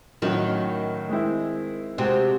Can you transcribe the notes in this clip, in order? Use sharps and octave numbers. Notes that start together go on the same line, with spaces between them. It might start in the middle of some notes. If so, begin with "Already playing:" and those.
A2 D#3 F#3 C#4 F#4
G#3 C4 E4
C3 G#3 C4 F#4